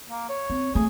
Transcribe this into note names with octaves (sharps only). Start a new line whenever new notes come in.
A#3
C#5
C4
A3 G#4